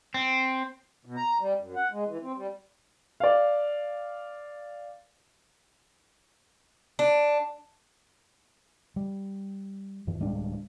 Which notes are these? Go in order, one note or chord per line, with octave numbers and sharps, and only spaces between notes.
C4
B2
A#5
G3
F#2
F#5
G#3
E3
C4
G3
D5 F5
D4
G3
F#2 E3
D1 G3 G#3 D4